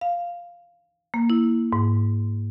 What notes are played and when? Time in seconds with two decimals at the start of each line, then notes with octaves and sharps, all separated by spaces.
0.01 F5
1.14 A#3
1.30 E4
1.73 G#2